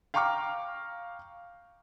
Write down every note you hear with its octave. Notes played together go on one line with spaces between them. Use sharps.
F5 G5 A#5 C#6 D6 F6